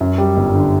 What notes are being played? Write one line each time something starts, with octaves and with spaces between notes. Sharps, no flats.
F#2
G3
G1
D3